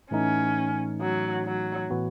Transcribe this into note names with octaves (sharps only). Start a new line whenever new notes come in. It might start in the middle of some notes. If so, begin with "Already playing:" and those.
A2 E3 A3 C#4 D#4
F#3
F#3
A2 E3 B3 F#4